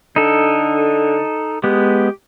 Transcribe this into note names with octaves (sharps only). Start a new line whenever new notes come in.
D3 D#4 A4
G#3 B3 G4